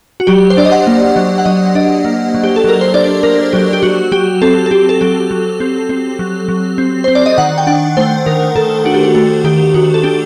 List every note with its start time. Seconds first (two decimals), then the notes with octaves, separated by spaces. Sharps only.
0.20 F#4
0.27 F#3 G4
0.50 C5
0.57 D4 D5
0.65 D#5
0.72 F#5
0.87 A#3
1.16 F#3
1.38 F#5
1.45 F#3 D#5
1.75 D4 D#5
2.05 A#3
2.35 F#3
2.44 G4
2.56 A4
2.64 F#3 A#4
2.81 C5
2.94 D4 D5
3.23 A#3 A#4
3.53 F#3 G4
3.73 G4
3.83 F#3 F#4
4.12 F#3 G4
4.42 C4 A4
4.66 A4
4.71 C4 G4
4.89 A4
5.01 F#3 G4
5.31 F#3
5.60 C4
5.89 C4
6.19 F#3
6.49 F#3
6.78 C4
7.04 C4 C5
7.15 D5
7.26 D#5
7.38 D#3 F#5
7.58 G5
7.67 D4 F#5
7.97 A3 C5
8.26 D#3 A#4
8.55 D#3 A4
8.85 D4 F#4
8.94 G4
9.03 F#4
9.15 A3 F#4
9.44 D#3 G4
9.74 D#3 F#4
9.94 A4
10.03 D4 G4